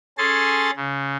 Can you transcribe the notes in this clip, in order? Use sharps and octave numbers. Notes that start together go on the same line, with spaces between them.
C#4 G#4 A4 C6 A6
C#3